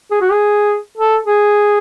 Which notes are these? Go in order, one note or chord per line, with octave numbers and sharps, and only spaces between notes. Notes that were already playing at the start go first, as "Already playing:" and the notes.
G#4
F#4
G#4
A4
G#4